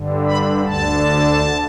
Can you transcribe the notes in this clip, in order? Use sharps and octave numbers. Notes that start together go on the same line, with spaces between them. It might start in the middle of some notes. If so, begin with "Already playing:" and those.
Already playing: G2 D3
B5
D2 D3 A5